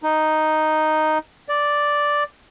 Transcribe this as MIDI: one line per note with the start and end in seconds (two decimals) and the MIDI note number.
0.03 1.18 63
1.49 2.24 74